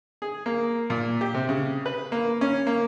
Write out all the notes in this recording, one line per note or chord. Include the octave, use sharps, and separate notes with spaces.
G#4
A#3
A#2
G4
C3
C#3
B4
A#3
C#4
A#3